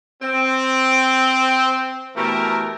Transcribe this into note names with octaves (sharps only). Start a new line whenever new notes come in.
C4
B2 E3 A3 G4 A#4